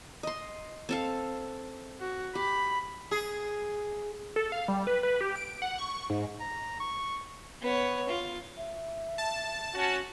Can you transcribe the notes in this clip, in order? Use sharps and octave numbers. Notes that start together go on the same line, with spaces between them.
D#5 C6
C4 A4 F5
F#4
G4 B5
G#4
A4
F5
G3
B4
B4
G4
D7
F#5
C#6
C#6
G#2
A#5
C#6
B3 C#5
F4
E5
A5
C#4 F#4